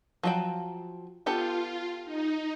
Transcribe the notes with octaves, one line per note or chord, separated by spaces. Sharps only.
F3 F#3 G5
B3 F4 G4 A4
D#4